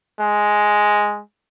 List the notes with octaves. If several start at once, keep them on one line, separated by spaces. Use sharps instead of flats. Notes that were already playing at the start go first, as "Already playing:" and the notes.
G#3